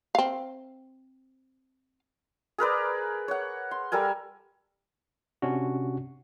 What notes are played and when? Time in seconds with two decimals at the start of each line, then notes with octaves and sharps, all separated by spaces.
0.15 C4 F5
2.58 G#4 A#4 B4 D5
3.28 C#5 F#5
3.71 C6
3.92 G3 A4 A#4 G#5
5.42 C3 C#4 D4 F#4